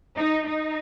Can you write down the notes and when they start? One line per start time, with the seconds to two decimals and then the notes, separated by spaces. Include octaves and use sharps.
0.16 D#4
0.46 D#4